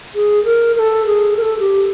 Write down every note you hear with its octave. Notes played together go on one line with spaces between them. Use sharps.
G#4
A#4
A#4
A4
G#4
A#4
A4
G4